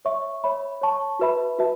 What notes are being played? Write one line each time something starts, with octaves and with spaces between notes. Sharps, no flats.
C#5 E5 C#6
C#5 E5 B5
C#5 A5 C#6
F#4 B4 E5 B5
F#4 B4 E5 A5